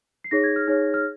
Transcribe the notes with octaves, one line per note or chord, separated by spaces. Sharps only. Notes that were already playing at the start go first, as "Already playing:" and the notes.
C7
D#4 G#4 C#5 A#6
G#6
F6
D#4 G#4 C#5 F6
F6